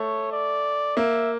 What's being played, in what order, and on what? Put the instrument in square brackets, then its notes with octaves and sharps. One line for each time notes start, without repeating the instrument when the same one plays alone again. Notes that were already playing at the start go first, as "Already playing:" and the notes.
Already playing: [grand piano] A3 [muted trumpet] C#5
[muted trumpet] D5
[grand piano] A#3 [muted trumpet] E5